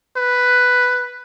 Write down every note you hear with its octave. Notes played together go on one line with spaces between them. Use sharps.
B4